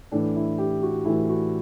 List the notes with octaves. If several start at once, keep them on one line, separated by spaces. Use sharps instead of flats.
A2 E3 D4
E4
G4
F#4
A2 E3 E4
F#4